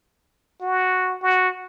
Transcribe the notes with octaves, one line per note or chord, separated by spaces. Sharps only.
F#4
F#4